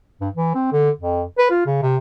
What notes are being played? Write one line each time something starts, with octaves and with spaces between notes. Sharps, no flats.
G2
E3
C4
D3
F2
B4
F4
C#3
C3